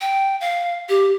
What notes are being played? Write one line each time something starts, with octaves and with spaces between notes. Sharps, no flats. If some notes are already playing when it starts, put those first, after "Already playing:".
G5
F5
G4